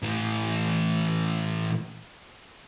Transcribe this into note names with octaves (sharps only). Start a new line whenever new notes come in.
A2 E3